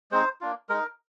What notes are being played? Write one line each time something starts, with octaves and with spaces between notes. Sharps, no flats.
G#3 C4 D#4 C5
A#3 D4 F4
G#3 D#4 A#4